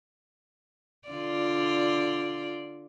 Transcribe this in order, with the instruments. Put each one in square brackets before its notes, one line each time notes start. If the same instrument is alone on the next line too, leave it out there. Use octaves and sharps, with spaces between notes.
[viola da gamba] D3 F4 D5